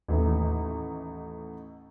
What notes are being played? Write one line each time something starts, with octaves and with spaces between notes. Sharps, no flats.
A1 D#2 A3 D#4